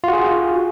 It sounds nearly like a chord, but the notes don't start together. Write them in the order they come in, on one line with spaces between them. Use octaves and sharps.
F4 F#4 G#4